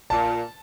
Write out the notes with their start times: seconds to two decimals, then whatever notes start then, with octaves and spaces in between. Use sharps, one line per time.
0.10 A#2 A5